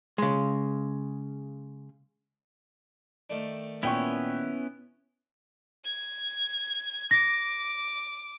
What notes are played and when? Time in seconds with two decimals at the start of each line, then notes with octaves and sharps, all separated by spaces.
0.18 C#3 G#3
3.30 D#3 A3 D4
3.83 A#2 B3 C#4 E4 G5 C#6
5.84 G#6
7.11 D6 A#6